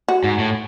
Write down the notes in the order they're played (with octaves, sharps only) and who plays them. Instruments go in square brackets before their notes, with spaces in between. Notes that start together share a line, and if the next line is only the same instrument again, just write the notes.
[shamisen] F#4
[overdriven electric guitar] G#2
A2